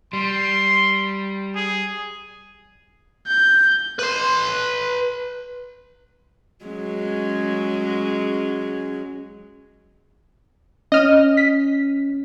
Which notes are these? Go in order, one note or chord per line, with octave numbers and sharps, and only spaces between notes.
G3 C6
G#4
G6
B4 C6
F#3 G#3 C#4
C#4 D#5 F6 D#7
B6